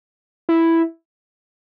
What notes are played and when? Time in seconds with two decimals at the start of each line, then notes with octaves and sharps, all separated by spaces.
0.49 E4